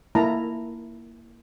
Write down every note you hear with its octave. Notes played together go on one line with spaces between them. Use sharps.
A#3 E4 A5 A#5